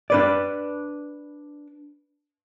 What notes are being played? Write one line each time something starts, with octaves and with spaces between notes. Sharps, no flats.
D4 B4 D5